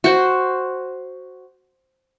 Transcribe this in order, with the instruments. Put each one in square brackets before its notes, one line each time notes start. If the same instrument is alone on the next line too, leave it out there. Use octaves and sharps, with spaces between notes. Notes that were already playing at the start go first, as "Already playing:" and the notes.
[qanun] F#4 C5